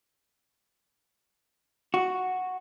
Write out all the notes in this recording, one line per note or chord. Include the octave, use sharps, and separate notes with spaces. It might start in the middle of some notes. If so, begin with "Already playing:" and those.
F#4